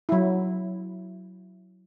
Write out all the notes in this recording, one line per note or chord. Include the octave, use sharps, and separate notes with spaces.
F#3 E4